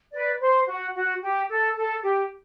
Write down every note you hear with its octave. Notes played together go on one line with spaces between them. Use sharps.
B4 D5
C5
F#4
F#4
G4
A4
A4
G4